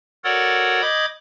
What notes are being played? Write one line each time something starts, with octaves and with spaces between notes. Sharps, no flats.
F#4 A4 A#4 C#5 D5 F#5
D#5 B5 D6 D#6 G6 G#6